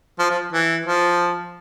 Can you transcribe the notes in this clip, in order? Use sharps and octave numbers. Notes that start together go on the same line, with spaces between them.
F3
F3
E3
F3